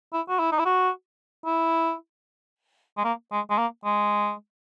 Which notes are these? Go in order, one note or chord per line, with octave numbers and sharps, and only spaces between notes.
E4
F#4
E4
D#4
E4
F#4
E4
G#3
A#3
G#3
G#3
A#3
G#3